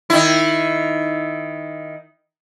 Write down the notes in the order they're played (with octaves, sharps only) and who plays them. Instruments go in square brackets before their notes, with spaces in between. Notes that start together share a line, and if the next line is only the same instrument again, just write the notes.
[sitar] D#3 E4